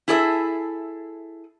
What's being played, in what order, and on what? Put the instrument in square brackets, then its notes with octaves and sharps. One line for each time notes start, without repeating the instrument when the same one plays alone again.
[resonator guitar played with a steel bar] E4 G#4 A4 D5 E5